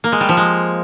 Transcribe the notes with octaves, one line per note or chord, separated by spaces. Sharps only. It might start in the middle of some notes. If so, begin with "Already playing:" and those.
A#3
G#3
G3
F3
G#3